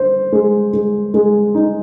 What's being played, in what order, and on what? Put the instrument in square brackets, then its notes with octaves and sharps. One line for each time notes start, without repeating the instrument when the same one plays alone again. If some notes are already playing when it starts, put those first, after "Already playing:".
Already playing: [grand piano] C5
G#3
G#3
G#3
D#4